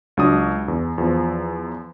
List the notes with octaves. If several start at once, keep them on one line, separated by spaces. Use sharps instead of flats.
C#2 F#3 D4 D#6
E2
E2 F3